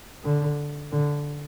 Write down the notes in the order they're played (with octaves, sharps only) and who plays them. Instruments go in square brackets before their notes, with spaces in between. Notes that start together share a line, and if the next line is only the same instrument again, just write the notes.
[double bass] D3
D3